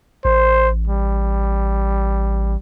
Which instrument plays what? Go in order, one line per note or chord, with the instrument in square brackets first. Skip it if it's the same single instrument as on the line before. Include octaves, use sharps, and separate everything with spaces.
[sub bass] A1 [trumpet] C5
[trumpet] G3